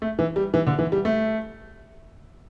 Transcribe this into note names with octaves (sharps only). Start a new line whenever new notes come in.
A3
E3
G3
E3
D3
E3
G3
A3